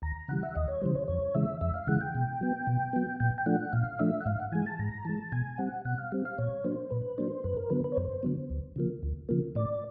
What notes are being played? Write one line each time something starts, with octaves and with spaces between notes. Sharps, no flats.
D#2 A#5
C#3 E3 G3 F#5
E5
D#2 D#5
C#5
C#3 E3 G3 C5
C#5
F2 C#5
C#3 E3 G#3 E5
F2 E5
F5
C#3 E3 G#3 F#5
G5
B2
F#3 B3
B2
F#3 B3
A#2 G5
G5
F3 A3 D4 F#5
A#2 F5
F3 A3 D4 E5
F#5
G#2 F5
F#5
E3 G#3 G#5
A5
G#2 A#5
E3 G#3 A5
B2 G#5
G3 C4 F#5
B2 F#5
F5
G3 C4
F5
A#2 C#5
F#3 A#3 D4 C5
A#2 B4
F#3 A#3 D4 C5
F#2 B4
A#4
D3 F#3 B3 B4
B4
C#5
F#2 C5
D3 F#3 B3
D2
C#3 F3 A#3
D2
C#3 F3 A#3
A2 D5